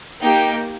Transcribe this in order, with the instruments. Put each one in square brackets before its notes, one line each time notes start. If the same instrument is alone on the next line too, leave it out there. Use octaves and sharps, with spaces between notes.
[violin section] A#3 D#4 G4 G5